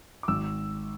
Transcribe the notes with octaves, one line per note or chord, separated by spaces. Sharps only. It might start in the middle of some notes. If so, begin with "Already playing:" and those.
D6
G#1 E6